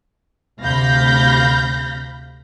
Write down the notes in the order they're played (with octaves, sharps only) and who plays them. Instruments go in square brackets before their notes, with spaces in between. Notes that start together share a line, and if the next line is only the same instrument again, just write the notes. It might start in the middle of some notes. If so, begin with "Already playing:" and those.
[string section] D2 C3 F5 B5 G6 A#6